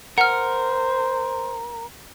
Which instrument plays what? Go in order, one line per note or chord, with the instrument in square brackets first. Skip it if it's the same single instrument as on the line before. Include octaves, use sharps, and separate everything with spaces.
[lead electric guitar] A#4 [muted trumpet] C5 [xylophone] F#5 F6